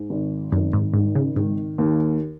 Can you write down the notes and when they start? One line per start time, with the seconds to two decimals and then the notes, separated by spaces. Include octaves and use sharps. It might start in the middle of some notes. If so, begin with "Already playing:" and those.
Already playing: G#2
0.10 G#1
0.52 G#1 F#2
0.73 G#2
0.93 G#2 D#3
1.15 C#3
1.36 G#2 D#3
1.78 D#2